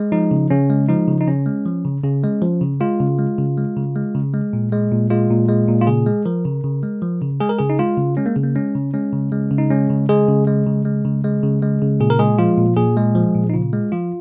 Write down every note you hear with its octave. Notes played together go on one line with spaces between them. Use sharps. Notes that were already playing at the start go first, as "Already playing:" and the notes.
Already playing: G#3
F3 D#4
C#3
C#3 C#4
G#3
F3 D#4
C#3
D#4
C#3 C#4
G#3
F3
C#3
C#3 C#4
G#3
F3
C#3
G#3 F4
C#3
G#3
C#3
G#3
C#3
G#3
C#3
G#3
A#2
G#3
A#2
G#3 F4
A#2
G#3
A#2
F4
C#3 G#4
G#3
F3 A#4
C#3
C#3
G#3
F3
C#3
G#3 G#4
A#4
C#3 G#4
D#4
G#3 F4
C#3
G#3 C#4
A#3
C#3
A#3
G#3 C#4
C#3
G#3 C#4
C#3
G#3
C#3
D#4
G#3 C#4
C#3
G#3 G#4
C#3
G#3
C#3
G#3
C#3
G#3
C#3
G#3
C#3
A#2 G#4
A#4
G#3 G#4
F3 F4
A#2
A#2 G#4
G#3
F3
A#2
D#4
C#3 F4
G#3
F3 F4